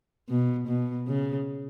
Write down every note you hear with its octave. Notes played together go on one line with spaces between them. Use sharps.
B2
B2
C#3